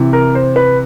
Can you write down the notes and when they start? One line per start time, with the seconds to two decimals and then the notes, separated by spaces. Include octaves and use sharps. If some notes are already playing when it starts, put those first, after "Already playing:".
Already playing: C3 E3
0.13 A#4
0.35 C5
0.56 B4